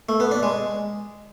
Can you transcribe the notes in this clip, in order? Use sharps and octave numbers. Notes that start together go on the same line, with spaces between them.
A3
B3
D4
G#3